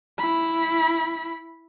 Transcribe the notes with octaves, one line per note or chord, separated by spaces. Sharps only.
E4 B5